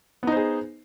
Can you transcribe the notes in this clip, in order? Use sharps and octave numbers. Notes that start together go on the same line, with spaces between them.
B3 D#4 G#4 C5